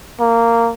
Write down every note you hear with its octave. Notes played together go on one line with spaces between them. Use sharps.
A#3